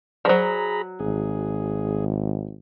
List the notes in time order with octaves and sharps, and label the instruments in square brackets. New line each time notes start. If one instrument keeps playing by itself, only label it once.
[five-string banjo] F3 F#3 [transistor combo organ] G#4 A#5 B5 [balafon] C5 D5
[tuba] G#1 [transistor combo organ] G#4